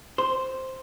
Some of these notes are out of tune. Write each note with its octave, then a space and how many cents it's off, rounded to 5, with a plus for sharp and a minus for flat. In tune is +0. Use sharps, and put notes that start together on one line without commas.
C5 +0 C6 +0